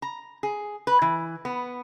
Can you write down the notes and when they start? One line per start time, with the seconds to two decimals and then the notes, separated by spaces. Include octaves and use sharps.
0.02 A#5
0.43 G#4
0.87 B4
1.02 E3
1.45 B3